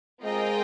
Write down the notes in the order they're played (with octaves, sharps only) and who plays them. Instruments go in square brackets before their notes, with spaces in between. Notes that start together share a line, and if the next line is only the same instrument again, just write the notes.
[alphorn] G#3 [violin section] C4 F4 A#4 D#5 G5